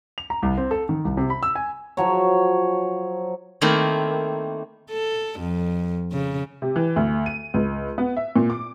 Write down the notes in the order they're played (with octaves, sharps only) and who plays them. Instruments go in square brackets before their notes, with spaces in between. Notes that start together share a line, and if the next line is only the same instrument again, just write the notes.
[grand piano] F7
A#5
C2
C4
A4
D#3
C2
C3
B5
E6
G#5
[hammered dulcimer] F3 F#3 C#5
[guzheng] D#3 A3 A#3 C4 E4
[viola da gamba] A4
F2
C#3
[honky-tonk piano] C3
E3
D2
D#7
C#2
B3
E5
A#2
D6